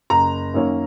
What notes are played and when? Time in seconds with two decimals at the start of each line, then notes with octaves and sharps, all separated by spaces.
0.10 F#1 A#5
0.54 F#2 D#3 A#3 C#4